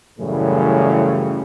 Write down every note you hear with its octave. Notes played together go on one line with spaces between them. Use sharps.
F#2 A2 C#3 E3 G3